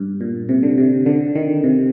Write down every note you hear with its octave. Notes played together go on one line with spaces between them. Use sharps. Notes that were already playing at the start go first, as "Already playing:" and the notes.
Already playing: G2
A#2
C3
D3
C3
D3
D#3
C3